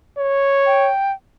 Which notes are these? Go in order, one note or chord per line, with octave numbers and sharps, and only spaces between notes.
C#5
G5